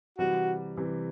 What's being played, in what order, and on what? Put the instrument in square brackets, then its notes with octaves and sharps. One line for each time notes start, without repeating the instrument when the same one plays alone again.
[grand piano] C3 E3 G3 [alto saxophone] F#4
[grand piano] C3 E3 G3